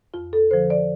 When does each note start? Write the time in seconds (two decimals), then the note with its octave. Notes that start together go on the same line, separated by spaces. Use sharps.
0.14 F2 F4
0.33 A4
0.51 D3 F3 C5
0.70 D5